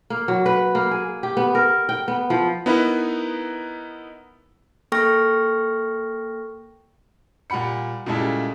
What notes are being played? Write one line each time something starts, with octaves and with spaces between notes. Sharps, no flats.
A#3
F#3
B4
A#3
G#4
G4
B3
A#4
G5
B3
F3
B3 D#4 E4 A#4 B4
A#3 A4 G5 C#6 F6 A#6
A#2 G3 F#5 B5 C#7
A#2 C#3 G3 G#3 E4 A4